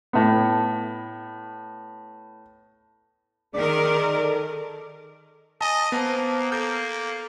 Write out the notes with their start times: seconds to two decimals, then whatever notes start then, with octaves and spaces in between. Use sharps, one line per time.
0.13 A2 B3
3.54 D#3 G#4 A#4 D5
4.22 A4
5.61 D#5 G#5 A5
5.92 A#3 B3 C5 A5
6.52 A#3 A4 G6